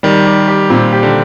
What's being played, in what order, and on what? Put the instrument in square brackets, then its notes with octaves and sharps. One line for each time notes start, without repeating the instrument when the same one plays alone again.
[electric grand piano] D#3 [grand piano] G3
[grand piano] G4
G4
[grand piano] A#2 [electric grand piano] C4
[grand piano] G4
[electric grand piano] D3